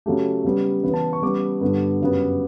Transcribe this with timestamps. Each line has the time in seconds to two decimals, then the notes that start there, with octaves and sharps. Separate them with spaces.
0.06 C#3 F#3 A3 G4
0.44 C#3 G3 B3
0.84 C#3 E3 B3 B4
0.94 A5
1.13 C#6
1.22 C#3 G3 B3 D6
1.61 G2 D3 G3 B3
2.01 F#2 C#3 G3 B3